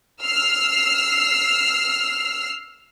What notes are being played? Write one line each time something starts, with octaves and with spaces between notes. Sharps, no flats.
E6 F6 C7